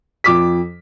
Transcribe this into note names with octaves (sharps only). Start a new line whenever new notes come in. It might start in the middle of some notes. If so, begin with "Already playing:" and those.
F2 D6 B6